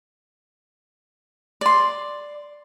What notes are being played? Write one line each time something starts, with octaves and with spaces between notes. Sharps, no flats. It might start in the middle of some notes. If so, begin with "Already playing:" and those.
D5 C6